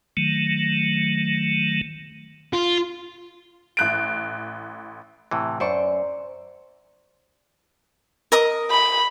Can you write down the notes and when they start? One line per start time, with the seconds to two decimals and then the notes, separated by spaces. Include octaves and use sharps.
0.17 D#3 F#3 A3
2.53 F4
3.77 A1 F#6 D7
5.31 A2 C3 E3
5.60 F#2 C5 D5 C#6
8.32 A#4 D#5 D#6
8.71 B5